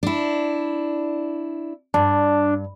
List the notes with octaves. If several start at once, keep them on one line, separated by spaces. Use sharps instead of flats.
D4 E4
G2 D4